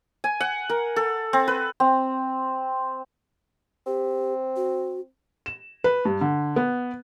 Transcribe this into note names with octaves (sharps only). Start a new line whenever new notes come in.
G#5
F#5
A#4
A4
C4
B4
C4
C4 G4
F#4
E7
B4
G2
D3
B3